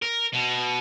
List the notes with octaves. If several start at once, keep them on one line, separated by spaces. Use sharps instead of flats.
A#4
B2